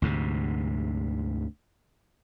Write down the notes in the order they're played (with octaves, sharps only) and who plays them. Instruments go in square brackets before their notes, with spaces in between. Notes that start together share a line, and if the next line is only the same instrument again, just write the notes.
[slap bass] D2 G#2 C3